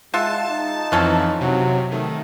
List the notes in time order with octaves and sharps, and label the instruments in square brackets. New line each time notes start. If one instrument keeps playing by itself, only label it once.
[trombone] G#3 [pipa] F4 E5 F#5 [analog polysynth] A5
[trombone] D#4
[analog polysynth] F2 E3 [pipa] F3 C#4 A4
[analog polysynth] C3 [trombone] F#3
[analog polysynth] D#3 [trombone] A3